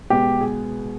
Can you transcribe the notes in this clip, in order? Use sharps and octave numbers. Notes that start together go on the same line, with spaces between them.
B2 G#3 B3 G4
G#4